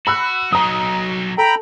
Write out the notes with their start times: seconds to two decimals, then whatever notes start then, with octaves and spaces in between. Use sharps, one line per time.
0.07 F#4 B5 E6 F#6
0.53 F#3 D#4 A#5 D#6
1.38 A4 G5 A#5 B5